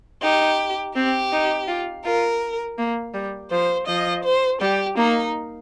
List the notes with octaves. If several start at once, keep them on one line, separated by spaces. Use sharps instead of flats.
D#4 G4
C4 G4
D#4
F4
F4 A#4
A#3
G3
F3 C5
F3 D#5
C5
G3 G4
A#3 D#4